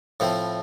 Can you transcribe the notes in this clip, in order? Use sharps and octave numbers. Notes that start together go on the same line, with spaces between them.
A2 F3 C4